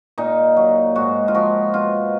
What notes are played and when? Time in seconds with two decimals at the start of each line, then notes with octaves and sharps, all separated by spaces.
0.18 A#2 D#4
0.57 F#3
0.96 G#2 F#4
1.28 F4
1.34 F3 F#4
1.74 B2 F4